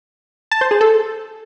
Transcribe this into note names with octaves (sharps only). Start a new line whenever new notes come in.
A5
C5
G#4
A4